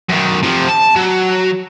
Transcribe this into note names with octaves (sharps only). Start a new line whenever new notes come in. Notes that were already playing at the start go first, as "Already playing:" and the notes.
F#2 D#3
C3 F3
A5
F#3